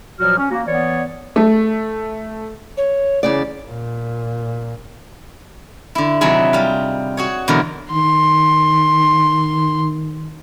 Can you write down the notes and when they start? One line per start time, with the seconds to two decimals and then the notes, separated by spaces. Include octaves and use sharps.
0.19 A#2 F3 F#3 F#4 F6
0.38 C#4
0.51 A#3 F#4
0.66 E3 B3 C#5 D5
1.36 A3
2.77 C#5
3.23 E2 C#3 D5
3.67 A#2
5.95 D3 E4
6.21 C3 D#3 F#3 D#4 E4 G#4
6.53 G3 F4
7.17 F#4 G#4 C#5
7.48 B2 D3 E3 F#3 G#3 A#4
7.91 D#3 C6